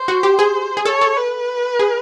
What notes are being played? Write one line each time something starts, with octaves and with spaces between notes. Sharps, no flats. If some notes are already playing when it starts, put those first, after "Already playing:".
Already playing: C5
F#4
G4
G#4
G#4
A4 C#5
A4
B4
G#4